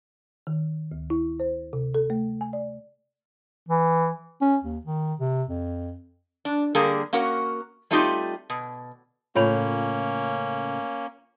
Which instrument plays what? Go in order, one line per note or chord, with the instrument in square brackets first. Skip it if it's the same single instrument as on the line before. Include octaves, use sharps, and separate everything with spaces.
[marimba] D#3
D2
E4
C5
C3
A4
A3
G#5
D5
[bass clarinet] E3
C#4
D#2
D#3
C3
F2
[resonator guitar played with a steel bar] D4
D3 G3 A#3 G#4 A#4
A#3 C#4 F#4 A#4
G3 A3 C4 D#4 F4 G4
B2
[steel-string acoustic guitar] A2 C#3 [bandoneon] A#3 C#4 [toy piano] F4 C#5 B5